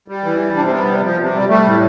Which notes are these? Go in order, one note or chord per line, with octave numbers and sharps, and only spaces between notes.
G3
E3
G3
C3 D4
C4
G3 B3
C3
F3
C3
G3
G3 A3
A2